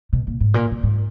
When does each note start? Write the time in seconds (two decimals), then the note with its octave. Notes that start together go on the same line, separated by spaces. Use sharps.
0.13 B2
0.27 A#2
0.40 G#2
0.54 A#2
0.71 A#2
0.83 G#2